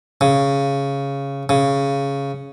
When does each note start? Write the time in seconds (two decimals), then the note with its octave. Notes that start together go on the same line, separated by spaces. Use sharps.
0.21 C#3
1.49 C#3